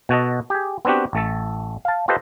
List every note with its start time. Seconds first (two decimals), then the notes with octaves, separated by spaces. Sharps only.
0.09 B2 F#4 A4 D#5
0.50 G4 G#4
0.85 B3 C4 D4 F#4 G4
1.13 A1 A3 A4
1.85 F5 A5
2.08 F4 G4 A4 B4 C5 D#5